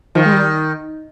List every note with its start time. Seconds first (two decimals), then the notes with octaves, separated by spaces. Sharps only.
0.15 D#3 F3
0.26 G#3
0.33 G3